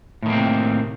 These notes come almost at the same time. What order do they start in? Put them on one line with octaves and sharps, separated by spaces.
A2 D#3 A#3 C4 C3